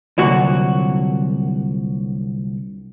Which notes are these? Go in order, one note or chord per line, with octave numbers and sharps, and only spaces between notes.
C2 A#2 D3 F#3 F#4